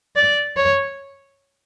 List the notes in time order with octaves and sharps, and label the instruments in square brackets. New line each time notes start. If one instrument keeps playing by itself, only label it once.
[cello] D5
C#5